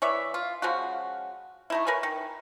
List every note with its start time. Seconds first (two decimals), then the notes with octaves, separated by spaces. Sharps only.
0.02 E3 C#5 D5 E5
0.34 F4
0.62 C#3 F3 G#3 F#4
1.70 A3 D#4 E4
1.87 A#4 B4 C#5 G#5
2.03 D#3